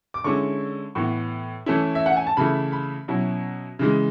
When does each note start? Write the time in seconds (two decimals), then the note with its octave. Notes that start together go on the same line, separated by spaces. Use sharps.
0.14 D6
0.24 D3 G#3 C#4 E4 C#6
0.95 A2 E3 B3 C#6
1.66 E3 A3 C#4 E4
1.95 E5
2.06 F#5
2.17 G#5
2.27 A5
2.37 C#3 E3 A3 E4 B5
2.72 B5
3.08 B2 F#3 C#4 E4
3.79 C#3 E3 G#3